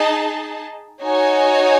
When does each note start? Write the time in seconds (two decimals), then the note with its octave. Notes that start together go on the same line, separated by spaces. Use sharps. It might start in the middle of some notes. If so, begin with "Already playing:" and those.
Already playing: D#4 G#4 D#5 A5
1.02 D#4 F#4 C#5 G#5